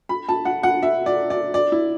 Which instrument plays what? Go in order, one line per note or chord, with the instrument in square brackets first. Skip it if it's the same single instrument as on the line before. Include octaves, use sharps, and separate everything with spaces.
[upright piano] B5
A5
F#5
F#5
E5
D5
D5
D5
E4